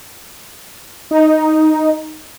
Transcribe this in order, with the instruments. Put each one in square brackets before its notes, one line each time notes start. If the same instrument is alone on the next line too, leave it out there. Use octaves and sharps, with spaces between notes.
[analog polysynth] D#4